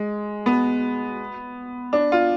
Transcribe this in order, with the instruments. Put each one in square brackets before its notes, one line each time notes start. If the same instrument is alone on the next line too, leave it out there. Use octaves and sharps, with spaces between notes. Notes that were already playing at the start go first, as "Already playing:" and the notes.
Already playing: [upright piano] G#3
B3
D4
F4